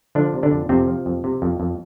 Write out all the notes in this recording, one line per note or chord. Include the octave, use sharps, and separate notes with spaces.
D3 F3 D4
C3
D3 D4
F2
F2 C3 C4
F3
F2
C3
F2
F2